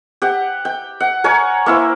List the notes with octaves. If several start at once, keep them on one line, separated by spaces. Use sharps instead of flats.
G4 F#5
G5
F#5
A#4 C#5 F#5 G#5
A#3 E4 C5